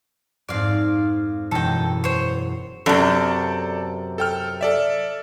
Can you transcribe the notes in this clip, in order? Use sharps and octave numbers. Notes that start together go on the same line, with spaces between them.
F2 G#2 D5 F5
E1 F#2 A4 D#5 G5
C5 C#5
F#2 C3 A4 D5 A5
A4 G5 F6
A4 D5 E5